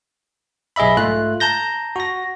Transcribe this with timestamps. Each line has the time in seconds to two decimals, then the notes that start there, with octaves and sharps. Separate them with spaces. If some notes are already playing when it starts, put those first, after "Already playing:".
0.76 B1 G#4 D#5 E5 B5
0.97 G#2 A3 F4 F#6
1.40 A5 A#5 G6 A#6
1.96 F#4 A#6